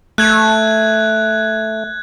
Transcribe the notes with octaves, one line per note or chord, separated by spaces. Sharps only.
A3 F#6 G#6